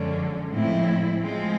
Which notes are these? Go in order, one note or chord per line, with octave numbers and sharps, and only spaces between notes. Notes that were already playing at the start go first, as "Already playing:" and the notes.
Already playing: F#2 D3 F3 G#3 C#4
A2 F3 G#3 C4 E4
F3 G#3 C4